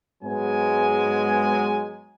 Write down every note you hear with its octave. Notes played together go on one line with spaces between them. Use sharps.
G#2 F#3 G#3 B3 G#5